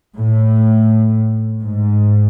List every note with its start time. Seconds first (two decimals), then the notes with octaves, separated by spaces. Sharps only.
0.17 A2
1.63 G#2